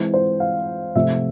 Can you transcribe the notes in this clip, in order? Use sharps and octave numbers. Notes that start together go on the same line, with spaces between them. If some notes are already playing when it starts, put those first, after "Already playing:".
Already playing: E3 G#3 C4
C5
F5
C3 F3 A3 C4 E5